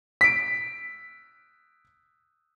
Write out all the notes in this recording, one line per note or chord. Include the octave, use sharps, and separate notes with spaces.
B6 D7